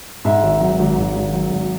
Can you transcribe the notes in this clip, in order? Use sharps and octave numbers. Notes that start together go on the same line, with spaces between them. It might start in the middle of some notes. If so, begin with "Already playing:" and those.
G#2 E5
G#1
F#3
G#1
G#2
G#1
F#3
G#1